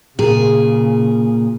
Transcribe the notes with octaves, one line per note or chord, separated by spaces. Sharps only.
A#2 C#3 G#4